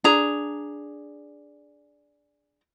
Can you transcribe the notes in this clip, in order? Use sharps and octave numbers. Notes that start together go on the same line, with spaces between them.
D4 G#4 A#5